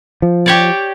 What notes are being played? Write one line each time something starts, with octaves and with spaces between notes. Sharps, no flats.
F3
G4 C#5 D5